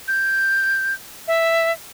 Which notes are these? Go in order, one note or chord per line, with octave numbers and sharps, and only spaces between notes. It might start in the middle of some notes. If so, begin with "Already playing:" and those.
G6
E5